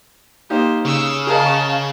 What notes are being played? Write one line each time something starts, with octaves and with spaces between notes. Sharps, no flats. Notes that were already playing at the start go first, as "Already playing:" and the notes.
A#3 D#4 G4 C5
C#3 E6
G#4 A#4 D#5 F5 A5